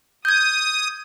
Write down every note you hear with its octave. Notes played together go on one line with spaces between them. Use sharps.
D#6 G6 G#6